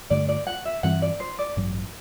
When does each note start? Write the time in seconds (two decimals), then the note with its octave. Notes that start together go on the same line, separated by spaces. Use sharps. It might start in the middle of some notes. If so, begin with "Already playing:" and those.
0.10 G2 D3 A3 D5
0.29 D5
0.47 F#5
0.65 E5
0.83 G2 E3 G3 C4 F#5
1.02 D5
1.20 C5
1.39 D5
1.57 A1 G2 F#3